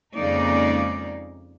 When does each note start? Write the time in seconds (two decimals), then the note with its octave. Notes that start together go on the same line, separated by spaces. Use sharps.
0.15 F2 C#3 G#3 A#3 D#4 D5